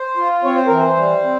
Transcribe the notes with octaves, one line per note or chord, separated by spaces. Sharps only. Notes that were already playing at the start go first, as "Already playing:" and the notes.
Already playing: C5
F4
C4 C#5
C5
E3 A#4
C5
G3
C4